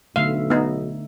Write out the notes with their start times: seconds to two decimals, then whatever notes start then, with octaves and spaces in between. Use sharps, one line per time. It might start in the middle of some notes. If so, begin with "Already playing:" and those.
0.16 B1 D3 A3 E5 F5
0.50 B3 D#4